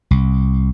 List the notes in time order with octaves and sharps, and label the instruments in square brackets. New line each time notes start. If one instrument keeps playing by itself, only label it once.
[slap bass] C2